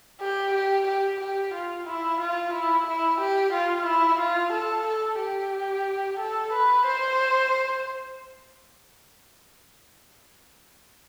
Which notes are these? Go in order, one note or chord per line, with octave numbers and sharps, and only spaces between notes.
G4
G4
G4
G4
F4
E4
F4
E4
E4
G4
F4
E4
F4
A4
A4
G4
A4
B4
C5